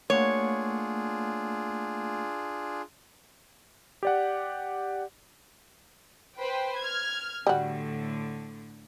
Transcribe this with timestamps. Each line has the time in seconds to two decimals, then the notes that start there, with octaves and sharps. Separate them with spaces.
0.10 A3 A#3 D4 F4 G#4 C#5 F#5
4.03 G4 D5 F#5
6.36 B4 C5 G5
6.79 F6 G#6
7.47 A2 D3 G3 F#4